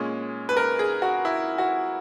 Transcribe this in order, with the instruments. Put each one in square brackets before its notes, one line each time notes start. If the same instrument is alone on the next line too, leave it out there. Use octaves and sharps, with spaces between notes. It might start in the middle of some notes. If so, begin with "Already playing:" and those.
Already playing: [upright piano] A#2 G#3 C#4
B4
A#4
G#4
F#4
E4
F#4